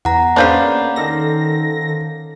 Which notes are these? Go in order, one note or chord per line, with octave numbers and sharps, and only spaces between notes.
E2 F#5 A#5
C#3 A#3 B3 D4 C5 F5 G6
D#3 A4 A#6